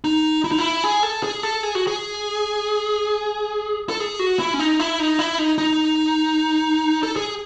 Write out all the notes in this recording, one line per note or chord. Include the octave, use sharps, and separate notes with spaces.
D#4
E4
D#4
E4
G#4
A4
G#4
A4
G#4
F#4
G#4
A4
G#4
F#4
E4
C#4
D#4
E4
D#4
E4
D#4
D#4
A4
G#4